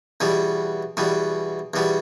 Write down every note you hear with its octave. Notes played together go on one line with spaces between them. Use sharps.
E2 B2 G3
E2 B2 G3
E2 B2 G3